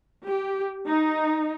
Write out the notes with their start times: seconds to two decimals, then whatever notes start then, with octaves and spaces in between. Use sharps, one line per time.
0.25 G4
0.86 D#4